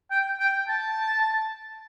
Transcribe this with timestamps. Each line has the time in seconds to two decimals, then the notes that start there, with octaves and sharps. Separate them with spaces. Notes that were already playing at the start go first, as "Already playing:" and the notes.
0.11 G5
0.40 G5
0.68 A5